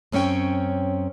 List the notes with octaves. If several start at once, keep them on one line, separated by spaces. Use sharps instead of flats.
F#2 C4 C#4 C#5 G5